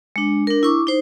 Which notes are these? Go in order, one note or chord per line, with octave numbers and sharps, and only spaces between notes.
G#3 D4
D4 A#4
E4 C#6 D6
D#4 C5